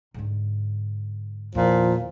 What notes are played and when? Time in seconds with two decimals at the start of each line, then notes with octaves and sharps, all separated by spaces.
0.14 G#2 D3
1.55 E2 A#2 D#3 F3